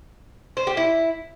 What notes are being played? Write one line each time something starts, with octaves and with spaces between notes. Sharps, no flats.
C5
G4
E4